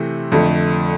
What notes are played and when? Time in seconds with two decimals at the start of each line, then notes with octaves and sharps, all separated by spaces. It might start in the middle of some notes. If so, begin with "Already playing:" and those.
Already playing: C3 E3 A3 C4
0.32 F2 D3 A3